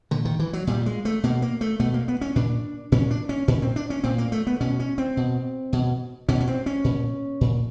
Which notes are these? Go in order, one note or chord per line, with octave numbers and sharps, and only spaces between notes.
A#2 D3
D#3
E3
F#3
A#2 G3
G#3
A3
B2 A#3
A#3
A3
B2 A3
A#3
B3
C#4
A#2 D4
A#2 C#4
D4
C#4
A#2 C#4
C4
D4
C#4
A#2 C4
A#3
A3
B3
B2 C#4
C#4
C4
B2
B2
B2 C#4
C#4
C4
C#4
A#2
A#2